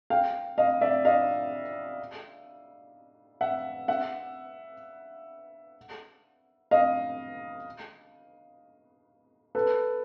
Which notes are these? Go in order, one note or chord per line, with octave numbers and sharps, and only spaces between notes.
F5 G5
D#5 F5
D5 E5
D#5 F5
E5 F#5
E5 F#5
D#5 F5
A4 B4